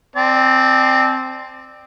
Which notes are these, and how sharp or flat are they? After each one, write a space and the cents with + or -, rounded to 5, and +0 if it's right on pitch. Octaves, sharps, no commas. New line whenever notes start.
C4 +0 D5 +25 A5 -40